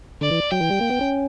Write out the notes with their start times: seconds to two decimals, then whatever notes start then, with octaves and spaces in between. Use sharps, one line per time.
0.21 D3 D5
0.31 E3
0.51 F#3 G5
0.61 E3
0.71 G3
0.81 A#3
0.90 B3
1.01 C#4